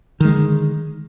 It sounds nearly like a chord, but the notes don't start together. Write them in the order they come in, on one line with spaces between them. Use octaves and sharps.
D#3 G#3 D3